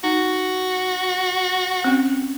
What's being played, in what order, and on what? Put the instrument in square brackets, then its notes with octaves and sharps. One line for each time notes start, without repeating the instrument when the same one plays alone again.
[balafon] D#4 [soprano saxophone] F#4
[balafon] C4 C#4